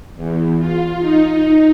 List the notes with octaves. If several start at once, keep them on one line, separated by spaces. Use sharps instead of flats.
E2
F4
D#4